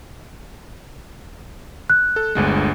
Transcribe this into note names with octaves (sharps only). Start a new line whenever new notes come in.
F#6
A4
G1 D2 G#3